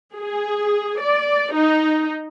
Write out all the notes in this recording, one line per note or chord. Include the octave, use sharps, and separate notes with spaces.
G#4
D5
D#4